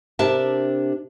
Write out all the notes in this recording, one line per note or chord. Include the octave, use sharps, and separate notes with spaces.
C3 D4 G4 A#4 E5 A5